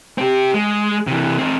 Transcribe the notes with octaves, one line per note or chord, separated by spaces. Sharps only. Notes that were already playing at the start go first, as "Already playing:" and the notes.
C4 G4
G#3
C3 E3
C4 D#4